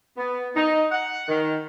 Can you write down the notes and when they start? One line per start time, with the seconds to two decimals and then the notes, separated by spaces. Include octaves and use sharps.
0.17 B3
0.55 D#4
0.91 F#5
1.28 D#3